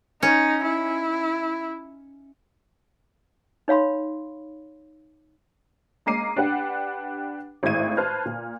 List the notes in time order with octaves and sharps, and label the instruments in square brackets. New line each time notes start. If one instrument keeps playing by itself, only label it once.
[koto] C#4 [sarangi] D#4
[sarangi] E4
[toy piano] D#4 C#5 F5 B5 C6
[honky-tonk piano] G#3 A#3 A#5 D6 C7 D#7
D4 G4 B4 F#5
G#1 A2 G#3 E5 G#6 D#7
B4 C5 A5 F6 G#6
A#2